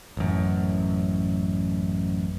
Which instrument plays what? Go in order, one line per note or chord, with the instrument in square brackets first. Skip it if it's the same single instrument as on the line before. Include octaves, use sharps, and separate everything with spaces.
[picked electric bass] A1 F#2